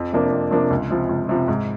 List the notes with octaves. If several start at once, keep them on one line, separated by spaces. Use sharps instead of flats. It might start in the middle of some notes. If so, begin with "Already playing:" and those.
Already playing: F2
C3 F3 A#3 D4
F2
C3 F3 A#3 D4
C#2
C3 F3
C#2
C3 F3
G#2